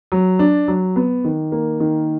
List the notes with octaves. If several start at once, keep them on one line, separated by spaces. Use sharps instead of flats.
F#3
D4
F#3
B3
D#3
A#3
D#3